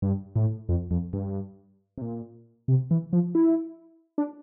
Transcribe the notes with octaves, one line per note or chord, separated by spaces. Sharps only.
G2
A2
F2
F2
G2
C3
A#2
C3
E3
F3
E4
D4